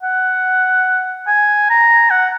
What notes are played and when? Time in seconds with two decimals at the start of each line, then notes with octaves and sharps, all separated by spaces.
0.03 F#5
1.27 G#5
1.70 A#5
2.10 F#5